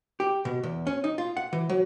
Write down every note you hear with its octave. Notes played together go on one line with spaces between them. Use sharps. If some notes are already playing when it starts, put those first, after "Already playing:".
G4
B2
E2
C#4
D#4
F4
F#5
E3
F#3